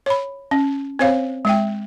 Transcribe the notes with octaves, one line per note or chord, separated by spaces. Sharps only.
C#5 B5
C#4
C4 C5 C#5 F5
G#3 E5 G5